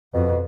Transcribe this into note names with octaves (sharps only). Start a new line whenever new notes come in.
F2 B2